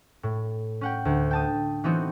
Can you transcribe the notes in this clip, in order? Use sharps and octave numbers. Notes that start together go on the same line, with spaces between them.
A2
C#4 F#5 G5
D2
G5 A5 D#6
E3 F#3 B3 C4 D#4 F#4